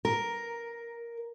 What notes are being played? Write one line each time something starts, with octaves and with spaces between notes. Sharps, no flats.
A#4